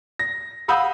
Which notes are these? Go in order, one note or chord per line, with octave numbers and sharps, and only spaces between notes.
A#6
F5 F#5 B5 D#6 E6 G6